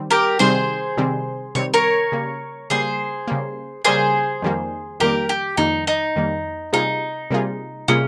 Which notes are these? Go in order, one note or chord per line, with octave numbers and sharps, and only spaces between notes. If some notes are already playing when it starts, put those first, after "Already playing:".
Already playing: D#3 G3 C4
G4 A#4
C3 D#3 G3 C4 G#4 C5
C3 D#3 G3 C4
C3 D#3 G3 C4 C#5
A#4 C#5
C#3 G3 A#3
C#3 G3 A#3 G#4 C5
C#3 G3 A#3
C#3 G3 A#3 G#4 C5
F2 D#3 G3 A#3
F2 D#3 G3 A#3 G4 A#4
G4
F2 D#3 G3 A#3 D#4
D#4
F2 D#3 G3 A#3
C3 G3 A#3 D#4 F4 G#4
C3 G3 A#3 F4 G#4
C3 G3 A#3 C#4 F4 G#4